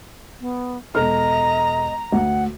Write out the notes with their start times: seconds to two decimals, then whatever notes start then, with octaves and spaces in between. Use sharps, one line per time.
0.41 B3
0.95 E1 A4 D#5 A#5 F6
2.12 D2 F#5